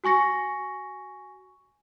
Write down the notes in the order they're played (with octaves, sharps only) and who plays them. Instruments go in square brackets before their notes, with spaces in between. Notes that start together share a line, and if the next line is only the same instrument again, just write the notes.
[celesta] F#4 G#5 C#6 A#6 C#7